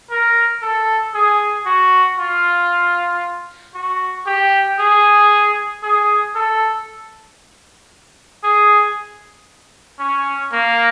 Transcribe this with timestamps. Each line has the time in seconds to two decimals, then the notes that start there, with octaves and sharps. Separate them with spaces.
0.10 A#4
0.62 A4
1.14 G#4
1.66 F#4
2.19 F4
3.74 F#4
4.26 G4
4.79 G#4
5.83 G#4
6.35 A4
8.44 G#4
9.99 C#4
10.52 A#3